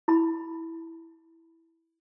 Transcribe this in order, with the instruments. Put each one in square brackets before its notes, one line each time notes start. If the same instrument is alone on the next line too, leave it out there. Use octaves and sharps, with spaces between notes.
[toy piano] E4 B5